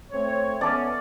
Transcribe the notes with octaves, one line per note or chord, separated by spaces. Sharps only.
A3 C4 C#5
B3 C#4 A4 D5